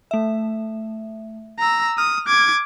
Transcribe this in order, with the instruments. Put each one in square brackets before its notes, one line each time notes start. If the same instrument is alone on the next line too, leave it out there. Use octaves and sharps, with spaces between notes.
[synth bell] A3 E5
[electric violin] A#5 E6
[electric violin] D#6 [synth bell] F6
[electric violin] D6 G#6